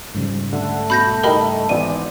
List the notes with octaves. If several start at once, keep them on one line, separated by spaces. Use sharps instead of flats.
F2 G#2 C#3 G3
D3 A3
B2 B5 G6 A#6
D#4 E4 G4 A#4 D#5 B5
G#1 E3 B3 D5 D#7